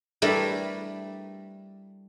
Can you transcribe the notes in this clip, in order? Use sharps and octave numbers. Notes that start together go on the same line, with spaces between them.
G3 A3 D4 E4 A#4 B4